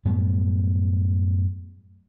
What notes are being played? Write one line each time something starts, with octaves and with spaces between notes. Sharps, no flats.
F#2 A2 G3 B3